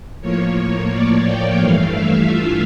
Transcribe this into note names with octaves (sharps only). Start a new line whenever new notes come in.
A2 F3 A#3 C#5
D5
G5
G2 E3 A3 F5
E5
F4